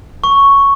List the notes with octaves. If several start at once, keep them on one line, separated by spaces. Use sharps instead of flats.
C#6